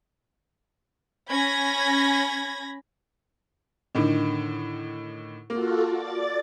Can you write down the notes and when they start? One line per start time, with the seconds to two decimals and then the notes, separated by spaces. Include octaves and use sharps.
1.29 C#4 B5 G#6 A#6
3.95 A2 D3 D#3
5.50 A#3 F4 F#4 A4
5.90 D5 A6